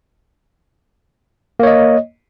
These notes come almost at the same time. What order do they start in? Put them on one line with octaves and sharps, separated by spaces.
A#3 C#5 D#5